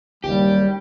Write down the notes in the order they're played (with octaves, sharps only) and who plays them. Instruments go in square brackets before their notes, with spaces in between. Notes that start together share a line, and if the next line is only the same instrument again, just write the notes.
[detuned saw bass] F#1 [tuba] D#2 [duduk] G3 [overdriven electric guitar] G4